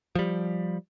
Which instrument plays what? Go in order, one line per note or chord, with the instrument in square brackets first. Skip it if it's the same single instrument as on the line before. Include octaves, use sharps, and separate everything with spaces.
[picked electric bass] F3 G3